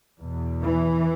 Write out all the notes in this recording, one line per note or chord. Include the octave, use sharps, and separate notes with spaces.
E2 B2
E3